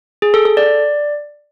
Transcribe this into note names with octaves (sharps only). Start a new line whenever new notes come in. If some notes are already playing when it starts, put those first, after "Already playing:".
G#4
A4
A4
D5